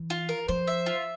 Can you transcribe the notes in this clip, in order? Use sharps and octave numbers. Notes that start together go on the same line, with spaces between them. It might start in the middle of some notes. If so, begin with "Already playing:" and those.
Already playing: E3
F4
A#4
F3 C5
E5
F4